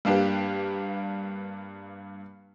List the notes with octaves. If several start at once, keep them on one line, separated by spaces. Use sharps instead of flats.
G2 A#3 D4 G4 B4